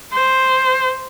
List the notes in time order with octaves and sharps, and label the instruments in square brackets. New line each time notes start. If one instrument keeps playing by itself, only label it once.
[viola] C5